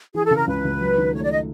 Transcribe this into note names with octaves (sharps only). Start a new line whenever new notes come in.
E3 G#4
A4
C#3
A#4
C#2 B4
C#2
F#3
D#3
A3 C#5
D5
D#5